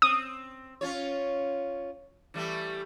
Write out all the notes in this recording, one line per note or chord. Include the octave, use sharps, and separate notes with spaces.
C4 D#6
C#4 F4 C#5
E3 G3 A3